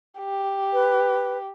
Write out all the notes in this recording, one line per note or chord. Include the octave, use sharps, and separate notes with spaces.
G4
B4